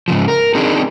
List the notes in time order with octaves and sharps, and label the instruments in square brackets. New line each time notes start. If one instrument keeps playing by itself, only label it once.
[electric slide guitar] G#2 C#3 F3
A#4
C4 D4 D#4 G#4